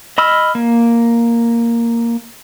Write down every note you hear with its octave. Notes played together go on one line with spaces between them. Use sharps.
D#5 B5 E6 F6
A#3